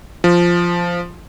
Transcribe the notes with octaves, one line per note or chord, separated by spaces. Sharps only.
F3